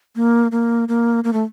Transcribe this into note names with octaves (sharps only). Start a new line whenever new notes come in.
A#3
A#3
A#3
A#3
A3